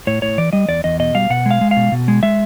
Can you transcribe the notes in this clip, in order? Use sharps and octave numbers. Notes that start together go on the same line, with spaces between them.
A2 C#5
A2 C#5
E3 D5
G3 D#5
E2 D5
E2 D#5
B2 D#5
G3 F5
B2 F#5
G#3 F5
G#3
F5
B2
B2
G#3
G#3 E5